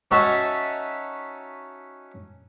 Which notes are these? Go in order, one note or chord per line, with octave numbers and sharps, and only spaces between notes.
C#4 D#4 F#4 C#5 E5 A5